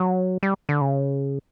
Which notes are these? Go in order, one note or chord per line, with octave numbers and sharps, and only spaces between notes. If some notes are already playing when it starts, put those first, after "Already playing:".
Already playing: F#3
G3
D3
C#3